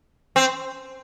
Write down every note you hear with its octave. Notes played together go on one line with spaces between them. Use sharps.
C4